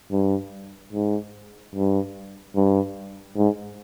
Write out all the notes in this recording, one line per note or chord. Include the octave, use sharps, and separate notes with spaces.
G2
G#2
G2
G2
G#2